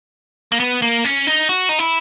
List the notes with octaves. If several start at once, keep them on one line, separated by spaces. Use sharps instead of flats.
A#3
B3
A#3
C#4
D#4
F#4
D#4
E4